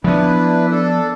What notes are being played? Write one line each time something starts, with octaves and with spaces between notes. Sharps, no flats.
F3 B3 D4 E4 B4
D4 A4